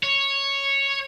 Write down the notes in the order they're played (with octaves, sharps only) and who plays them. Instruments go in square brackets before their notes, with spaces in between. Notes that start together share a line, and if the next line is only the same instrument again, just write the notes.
[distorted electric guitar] C#5